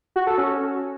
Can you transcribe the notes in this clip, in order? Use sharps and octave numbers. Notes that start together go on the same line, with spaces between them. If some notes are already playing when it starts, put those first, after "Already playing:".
F#4
A4
C#4